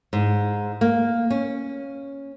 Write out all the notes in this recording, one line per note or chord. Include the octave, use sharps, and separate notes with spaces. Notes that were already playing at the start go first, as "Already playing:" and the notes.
G#2
A#3
C#4